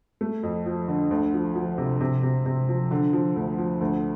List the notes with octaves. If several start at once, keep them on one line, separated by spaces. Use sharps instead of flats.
A3
F2
F3
D3
D2
F3
F3
C3
C3
C3
C3
F3
D3
F3
D2
F3
D2